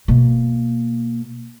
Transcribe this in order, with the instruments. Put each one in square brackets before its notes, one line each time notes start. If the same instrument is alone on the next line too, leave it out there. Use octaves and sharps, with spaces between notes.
[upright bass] B2 A#3